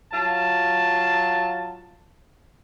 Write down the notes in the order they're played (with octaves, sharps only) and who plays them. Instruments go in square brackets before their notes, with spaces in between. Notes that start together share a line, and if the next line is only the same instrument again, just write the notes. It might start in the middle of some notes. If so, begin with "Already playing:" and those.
[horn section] F#3 F4 A5